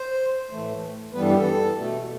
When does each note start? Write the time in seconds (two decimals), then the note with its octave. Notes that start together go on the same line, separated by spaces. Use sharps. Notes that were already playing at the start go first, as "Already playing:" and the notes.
Already playing: C5
0.51 A2 E3 A3
1.13 G2 E3 G3 B3 B4
1.22 A4
1.29 G4
1.38 A4
1.76 B2 A3